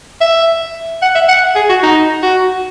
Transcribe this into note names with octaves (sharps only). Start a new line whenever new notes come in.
E5
F#5
E5
F#5
G#4
F#4
D#4
F#4